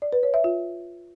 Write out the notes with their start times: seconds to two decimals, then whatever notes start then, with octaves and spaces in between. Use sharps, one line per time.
0.02 D5
0.13 B4
0.23 C#5
0.34 E5
0.44 F4